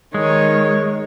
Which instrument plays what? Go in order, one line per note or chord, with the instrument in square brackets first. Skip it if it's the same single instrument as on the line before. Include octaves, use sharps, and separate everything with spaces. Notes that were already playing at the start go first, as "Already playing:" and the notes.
[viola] D#3 C#5 [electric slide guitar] G#3